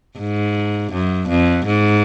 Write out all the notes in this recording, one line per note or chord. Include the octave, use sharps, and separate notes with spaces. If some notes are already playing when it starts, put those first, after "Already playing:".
G#2
F#2
F2
G#2